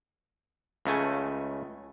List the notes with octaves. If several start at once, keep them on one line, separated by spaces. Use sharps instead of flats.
C#2 C#3 A3 G#5